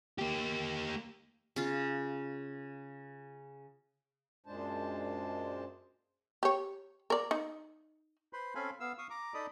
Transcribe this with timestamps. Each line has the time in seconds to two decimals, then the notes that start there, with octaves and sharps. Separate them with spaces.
0.19 A#3 G4
1.56 C#3 F4
4.46 F#2 A#2 G#3 D4 C5 A5
6.43 G4 C#5
7.10 A#4 D5
7.31 D#4
8.33 B4 C5 B5 C6
8.55 C4 C#4 A4 F5 G#5 B5
8.80 B3 F5 E6
8.98 F5 C#6 D#6
9.10 A#5 D6
9.34 D#4 A4 D5 D#5 B5 D#6